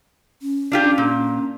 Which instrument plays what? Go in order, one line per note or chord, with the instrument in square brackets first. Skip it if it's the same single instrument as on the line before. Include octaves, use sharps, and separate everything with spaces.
[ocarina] C#4
[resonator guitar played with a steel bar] D4 F4 G4
A#2